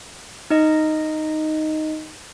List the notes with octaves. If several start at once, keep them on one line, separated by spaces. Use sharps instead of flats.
D#4 D#5